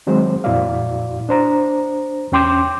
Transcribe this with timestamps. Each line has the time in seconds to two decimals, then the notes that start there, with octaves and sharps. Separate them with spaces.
0.07 D#3 F#3 G#3 C4 C5
0.44 F2 A#2 E4 F#4 D5 F5
1.29 D4 C5 A#5
2.32 E2 C#4 G5 C6 D6 G6